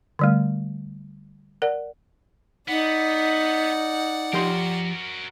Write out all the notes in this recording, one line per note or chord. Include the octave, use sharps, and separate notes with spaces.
D3 G3 A3
A#4 D5 F#5
B3 D#4 D5 F#5
F3 F#4 G4 A#4 C6